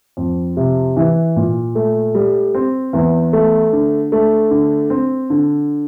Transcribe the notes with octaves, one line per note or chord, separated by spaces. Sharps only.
F2
C3
E3
A#2
A3
G3
C4
E2
A3
D3
A3
D3
C4
D3